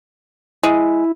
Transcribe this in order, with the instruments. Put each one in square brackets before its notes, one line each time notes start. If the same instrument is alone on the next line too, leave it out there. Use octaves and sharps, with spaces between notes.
[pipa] G#3 [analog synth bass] E4